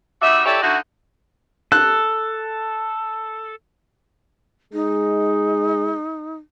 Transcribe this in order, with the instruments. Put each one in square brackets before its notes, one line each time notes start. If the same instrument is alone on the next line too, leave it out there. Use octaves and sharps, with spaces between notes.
[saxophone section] G3 D#4 F#4 D5 E5
E4 G4 A4 C#5 D5 E5
D3 D#4 E4 F#4
[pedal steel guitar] A4 [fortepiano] F#6
[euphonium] G#3 [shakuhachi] D#4